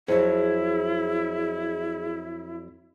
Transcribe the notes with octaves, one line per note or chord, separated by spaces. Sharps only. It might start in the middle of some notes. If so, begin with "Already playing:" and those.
F2 F#3 E4 G#4